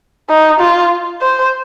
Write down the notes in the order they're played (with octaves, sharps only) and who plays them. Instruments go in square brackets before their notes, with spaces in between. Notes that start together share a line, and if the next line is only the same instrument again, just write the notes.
[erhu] D#4
F4
C5